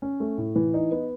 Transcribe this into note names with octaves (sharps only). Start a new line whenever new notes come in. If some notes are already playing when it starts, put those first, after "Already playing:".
C#4
A3
A2
E3
D#4
B3